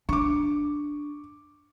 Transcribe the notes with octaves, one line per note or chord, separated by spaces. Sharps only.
D4 C#6 D6